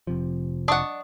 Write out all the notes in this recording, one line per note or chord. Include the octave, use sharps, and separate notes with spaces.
F1 C3 F3
D4 D#5 F#5 C#6 D#6